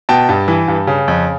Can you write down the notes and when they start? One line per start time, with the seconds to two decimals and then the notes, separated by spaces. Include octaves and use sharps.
0.09 B2 G5 A5
0.29 G2
0.48 E3
0.68 G2
0.87 C#3
1.08 F2